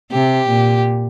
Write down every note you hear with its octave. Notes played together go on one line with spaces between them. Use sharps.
C3 G4
A#2